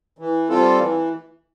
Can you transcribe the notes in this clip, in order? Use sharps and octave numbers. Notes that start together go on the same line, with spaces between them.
E3
G3 C4 F4 A4
E3